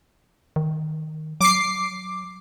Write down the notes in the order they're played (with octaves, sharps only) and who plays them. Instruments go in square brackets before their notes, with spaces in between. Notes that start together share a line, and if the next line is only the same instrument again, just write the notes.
[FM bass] D#3
[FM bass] F#3 [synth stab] D6 C7